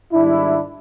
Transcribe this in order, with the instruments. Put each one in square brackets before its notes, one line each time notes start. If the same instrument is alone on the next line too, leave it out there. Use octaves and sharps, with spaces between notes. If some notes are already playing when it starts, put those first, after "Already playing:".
[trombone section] G#2 D#3 G3 D4 E4